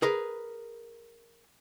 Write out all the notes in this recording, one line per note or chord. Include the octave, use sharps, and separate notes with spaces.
G#4 A#4 B4